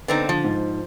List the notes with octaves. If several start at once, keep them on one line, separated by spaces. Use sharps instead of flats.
D3 B3 C4 D#4
D3 F3
G#2